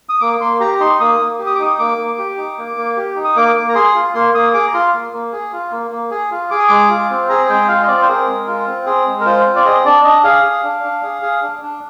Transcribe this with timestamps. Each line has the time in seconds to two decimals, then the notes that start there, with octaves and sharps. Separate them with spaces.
0.09 D#6
0.21 A#3 D6
0.41 A#3 C6
0.60 G4 A#5
0.80 D#4 C6
1.00 A#3 D#6
1.20 A#3
1.39 G4
1.46 D#6
1.55 D6
1.59 D#4 D#6
1.79 A#3 D6
1.98 A#3
2.19 G4
2.37 D#4
2.58 A#3
2.77 A#3
2.97 G4
3.16 D#4
3.24 D#6
3.36 A#3 D6
3.56 A#3
3.69 A#5
3.75 G#4 C6
3.95 F4
4.14 A#3 C6
4.34 A#3 D#6
4.53 G#4 D6
4.68 A#5
4.74 F4 C6
4.94 A#3
5.13 A#3
5.33 G#4
5.53 F4
5.71 A#3
5.91 A#3
6.11 G#4
6.31 F4
6.50 G#4 D6
6.59 D#6
6.68 G#3 D6
6.90 F4
7.10 C4
7.29 G#4 A#5
7.49 G#3 G5
7.68 F4 F5
7.83 D#5
7.88 C4 D5
8.02 C5
8.08 G#4 A#4
8.27 G#3
8.47 F4
8.67 C4
8.86 G#4
9.06 G#3
9.20 A#4
9.26 F4 C5
9.45 C4
9.56 D5
9.65 G#4 D#5
9.85 D4 D5
10.04 D4 D#5
10.24 G#4 F5
10.43 G#4
10.64 D4
10.83 D4
11.03 G#4
11.22 G#4
11.42 D4
11.62 D4